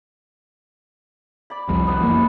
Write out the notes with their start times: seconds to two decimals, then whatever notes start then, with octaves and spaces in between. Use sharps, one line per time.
1.50 D5 B5
1.69 C2 F2 C3
1.87 B3 D#4 B4
1.99 F#1 E3 A#3